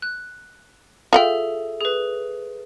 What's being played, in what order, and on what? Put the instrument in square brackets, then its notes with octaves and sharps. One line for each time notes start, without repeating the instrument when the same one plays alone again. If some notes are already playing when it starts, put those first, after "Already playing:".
[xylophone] F#6
[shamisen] F4 F#5 G5 [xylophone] G#4 A4 E5
[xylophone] G#4 B4